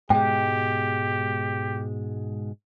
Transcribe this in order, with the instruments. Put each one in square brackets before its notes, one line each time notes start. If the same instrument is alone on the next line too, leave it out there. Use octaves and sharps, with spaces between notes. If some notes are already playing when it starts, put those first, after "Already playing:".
[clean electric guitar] G#2 B2 G#3 [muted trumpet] G4 [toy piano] G5